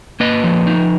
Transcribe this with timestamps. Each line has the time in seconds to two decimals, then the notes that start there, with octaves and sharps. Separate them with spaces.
0.20 A#3 B4 D#5
0.44 F3
0.67 D#4